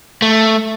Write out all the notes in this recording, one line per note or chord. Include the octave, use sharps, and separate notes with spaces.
A3